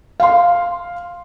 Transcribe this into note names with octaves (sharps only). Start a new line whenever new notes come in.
F5 C6